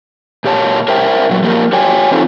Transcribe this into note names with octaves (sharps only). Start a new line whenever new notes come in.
A#2 G4 C#5 A5
A#4 C5 E5 G5
A#2 F#3
F3 A#3 G4 A#4
F#4 G4 C#5 G5 G#5
E3 C4 D#4 F4 A4 C5